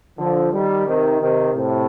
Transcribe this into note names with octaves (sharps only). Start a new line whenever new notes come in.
D3 F3
D#3 G3
C3 D#3
C3 D#3
A2 C3